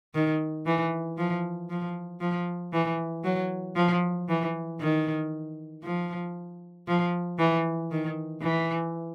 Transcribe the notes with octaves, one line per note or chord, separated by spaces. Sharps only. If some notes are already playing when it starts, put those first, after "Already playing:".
D#3
E3
F3
F3
F3
E3
F#3
F3
E3
D#3
F3
F3
E3
D#3
E3